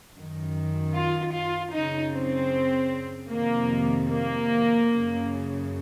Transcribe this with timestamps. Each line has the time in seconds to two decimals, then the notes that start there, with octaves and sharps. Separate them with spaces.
0.15 F#2 D#3
0.94 F4
1.34 F4
1.72 F#2 C#3 D#4
2.13 C4
3.32 F2 C3 D#3 A#3
4.11 A#3
4.91 F#2 C#3